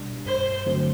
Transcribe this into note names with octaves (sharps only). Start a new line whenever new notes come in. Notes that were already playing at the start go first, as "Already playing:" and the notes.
Already playing: B2 G3 D4
G2 C5
D3 F#3 A3 C4